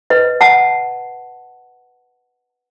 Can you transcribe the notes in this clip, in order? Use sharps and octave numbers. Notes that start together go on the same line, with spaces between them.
B4 D#5
F#5 A5